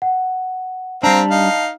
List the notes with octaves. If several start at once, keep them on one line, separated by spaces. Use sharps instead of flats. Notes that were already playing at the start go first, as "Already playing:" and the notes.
F#5
G3 C4 D4 F5 A5 A#5
D#4 F5